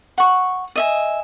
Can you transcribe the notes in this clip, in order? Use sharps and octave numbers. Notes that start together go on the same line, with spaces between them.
F#5 C#6
D#5 E5 G#5